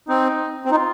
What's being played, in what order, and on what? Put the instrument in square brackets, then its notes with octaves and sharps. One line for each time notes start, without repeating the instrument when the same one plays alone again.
[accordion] C4 [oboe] D#4
[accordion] C4
[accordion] D#4 [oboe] F4